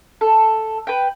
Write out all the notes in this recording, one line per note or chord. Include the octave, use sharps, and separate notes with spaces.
A4
B4 G5